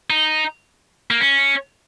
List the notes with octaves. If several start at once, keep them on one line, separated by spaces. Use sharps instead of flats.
D#4
A#3
C#4